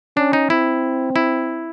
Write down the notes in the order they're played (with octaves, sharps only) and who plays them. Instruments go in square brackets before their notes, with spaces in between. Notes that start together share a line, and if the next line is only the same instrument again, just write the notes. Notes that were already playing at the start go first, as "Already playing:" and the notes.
[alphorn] C#4 [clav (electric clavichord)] D4
[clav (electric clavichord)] D#4
[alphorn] C4 [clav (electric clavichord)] E4
[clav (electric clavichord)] E4